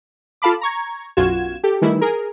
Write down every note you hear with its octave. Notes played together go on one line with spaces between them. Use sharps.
F4 A4 F5 A5 B5 D6
A#5 C#6 G#6
B1 F#2 F4 F#4 G#6 E7
G4 A4
D#3 E3 G3 A3 E4
G#4 A#4